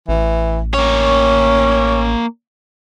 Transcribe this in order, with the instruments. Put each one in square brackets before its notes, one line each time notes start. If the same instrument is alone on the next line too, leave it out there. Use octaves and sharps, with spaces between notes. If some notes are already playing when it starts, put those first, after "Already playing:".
[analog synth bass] A1 [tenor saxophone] E3
[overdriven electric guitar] A#3 C#5 [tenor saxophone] C#4